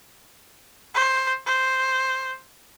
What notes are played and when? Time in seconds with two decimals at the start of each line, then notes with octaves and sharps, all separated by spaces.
0.94 C5
1.46 C5